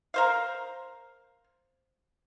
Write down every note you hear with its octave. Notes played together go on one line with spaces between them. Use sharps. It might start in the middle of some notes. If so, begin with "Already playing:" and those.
A#4 C5 F5